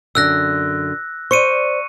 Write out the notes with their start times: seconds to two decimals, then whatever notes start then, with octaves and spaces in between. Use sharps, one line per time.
0.15 F#2 D3 E6 F#6 A#6
1.31 C5 D5 C#6 C#7 D#7